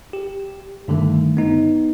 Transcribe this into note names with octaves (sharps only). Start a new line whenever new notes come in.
G4
G2 D3 D#3 A3
B3 D#4